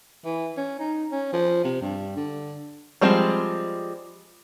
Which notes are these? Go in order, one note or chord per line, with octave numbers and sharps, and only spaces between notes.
E3
C#4
D#4
C#4
F3
C3
G2
D3
F3 G3 G#3 C4